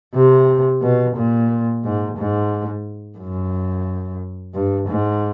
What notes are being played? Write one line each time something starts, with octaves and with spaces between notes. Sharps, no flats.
C3
B2
A#2
G#2
G#2
F#2
G2
G#2